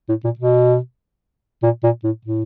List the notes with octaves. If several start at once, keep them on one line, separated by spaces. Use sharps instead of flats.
A2
A#2
B2
A#2
A#2
A2
A2